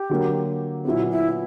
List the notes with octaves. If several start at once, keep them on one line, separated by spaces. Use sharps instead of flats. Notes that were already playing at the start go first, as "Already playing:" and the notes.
Already playing: G4
D3 F#3 A#3
A#2 F#3 B3 E4
E4